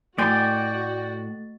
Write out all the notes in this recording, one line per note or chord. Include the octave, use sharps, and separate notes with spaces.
A2 A3 F#4 D5 G5 G#5 C6 A6